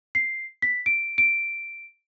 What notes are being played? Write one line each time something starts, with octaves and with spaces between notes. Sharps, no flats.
C7
B6
D7
D7